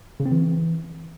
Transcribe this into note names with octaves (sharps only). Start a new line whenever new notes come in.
C#3
C4
E3